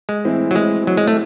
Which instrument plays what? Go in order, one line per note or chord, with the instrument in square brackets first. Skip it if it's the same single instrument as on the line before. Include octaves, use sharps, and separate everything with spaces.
[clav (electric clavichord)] G#3
[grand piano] A2 E3 C4 E4
[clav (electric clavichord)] F#3
G#3
F#3
G#3
A3